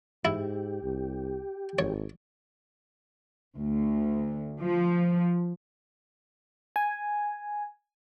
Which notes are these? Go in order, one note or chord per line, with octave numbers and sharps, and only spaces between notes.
G#2 E4 G4
C2
G#1 C#5
D2
F3
G#5